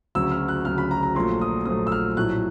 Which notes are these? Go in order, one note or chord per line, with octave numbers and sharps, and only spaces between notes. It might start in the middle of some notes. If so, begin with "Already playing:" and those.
D2 C#3 F#3 E6
F6
F#6
D2 C#3 F#3 F6
B5
A#5
A#5
A#1 A#2 F#3 A3 C6
D#6
A#1 A#2 F#3 A3 D#6
E6
F6
A#1 A2 F#3 F#6